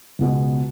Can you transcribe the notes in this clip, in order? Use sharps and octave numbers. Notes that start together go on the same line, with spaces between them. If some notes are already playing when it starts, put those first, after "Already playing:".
C#2 B2 G#3 B3